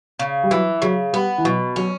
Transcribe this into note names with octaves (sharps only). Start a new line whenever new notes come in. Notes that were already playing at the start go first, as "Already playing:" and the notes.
C#3
G3
E3 F#3
C#3 F#3
G3 B3
E3
B2 F#3
F#3 C#4